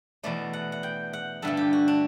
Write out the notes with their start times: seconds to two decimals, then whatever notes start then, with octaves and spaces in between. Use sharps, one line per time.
0.23 E2 B2 A3 D5
0.53 F#5
0.72 F#5
0.83 G5
1.13 F#5
1.42 G2 D3 A3 A4
1.57 G4
1.73 F#4
1.88 D4